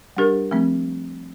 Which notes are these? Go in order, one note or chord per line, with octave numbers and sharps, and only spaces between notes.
G3 D4 G4 A#4
F3 A3 C4